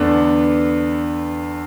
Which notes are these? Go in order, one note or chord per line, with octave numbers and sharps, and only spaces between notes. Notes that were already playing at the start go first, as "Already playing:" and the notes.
Already playing: E2 D3 A3 B3 D4